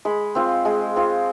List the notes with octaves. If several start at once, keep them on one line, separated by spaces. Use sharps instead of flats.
G#3 B5
C4 F4
G#3
C4 F4